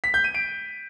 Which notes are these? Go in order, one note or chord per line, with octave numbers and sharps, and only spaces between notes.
B6
G6
D#7
D7